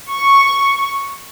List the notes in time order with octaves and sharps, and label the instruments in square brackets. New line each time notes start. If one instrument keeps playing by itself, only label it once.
[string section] C#6